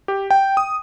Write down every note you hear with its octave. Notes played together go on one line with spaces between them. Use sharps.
G4
G5
D#6